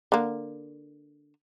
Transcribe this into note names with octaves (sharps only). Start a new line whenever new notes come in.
D3 A#3